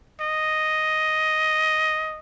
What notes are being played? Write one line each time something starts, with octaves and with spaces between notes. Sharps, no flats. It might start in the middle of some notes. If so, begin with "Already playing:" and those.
D#5